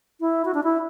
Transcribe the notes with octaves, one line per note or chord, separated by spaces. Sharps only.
E4
F#4
D4
E4